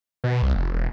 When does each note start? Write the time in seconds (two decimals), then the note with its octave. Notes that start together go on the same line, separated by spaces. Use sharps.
0.24 B2
0.42 C2
0.55 F1
0.74 E1